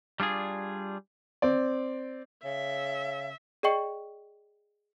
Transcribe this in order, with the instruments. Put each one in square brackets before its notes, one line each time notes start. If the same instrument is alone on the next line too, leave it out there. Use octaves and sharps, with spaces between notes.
[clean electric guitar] G3 D4 F4 G#4
[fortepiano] C4 D5
[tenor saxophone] C#3 [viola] E5
[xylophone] G#4 D5 D#5 G5 C#6 C#7